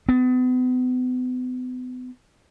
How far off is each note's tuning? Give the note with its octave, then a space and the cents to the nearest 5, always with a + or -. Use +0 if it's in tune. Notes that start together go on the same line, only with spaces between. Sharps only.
B3 +40